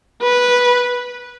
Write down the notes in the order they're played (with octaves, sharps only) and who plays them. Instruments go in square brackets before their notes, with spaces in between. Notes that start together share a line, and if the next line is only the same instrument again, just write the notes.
[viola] B4